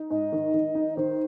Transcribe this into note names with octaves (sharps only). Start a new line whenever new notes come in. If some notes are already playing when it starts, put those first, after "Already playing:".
Already playing: D#4
G#2 D#5
D#3
D#3
D#4
D#3 C5